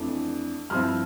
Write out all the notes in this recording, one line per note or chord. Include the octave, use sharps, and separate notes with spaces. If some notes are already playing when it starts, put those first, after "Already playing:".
Already playing: F2 E3 A3 D4
G2 F3 C4 E4 F6